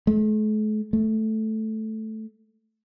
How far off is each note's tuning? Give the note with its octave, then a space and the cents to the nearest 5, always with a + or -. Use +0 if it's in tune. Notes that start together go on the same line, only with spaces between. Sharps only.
A3 -45
A3 -5